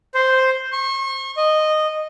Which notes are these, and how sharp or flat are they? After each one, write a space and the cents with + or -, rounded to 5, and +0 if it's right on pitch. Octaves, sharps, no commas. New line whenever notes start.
C5 +0
C#6 -40
D#5 -10